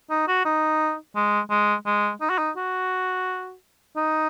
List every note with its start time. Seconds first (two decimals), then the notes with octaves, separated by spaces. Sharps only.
0.10 D#4
0.28 F#4
0.45 D#4
1.16 G#3
1.50 G#3
1.86 G#3
2.21 D#4
2.30 F#4
2.38 D#4
2.56 F#4
3.96 D#4